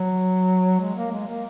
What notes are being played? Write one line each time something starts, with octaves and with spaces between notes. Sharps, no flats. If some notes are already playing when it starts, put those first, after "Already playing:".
Already playing: F#3
G#3
A#3
G#3
A#3